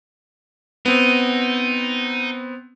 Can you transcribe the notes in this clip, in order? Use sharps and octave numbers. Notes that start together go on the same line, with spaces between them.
B3 C4 D#4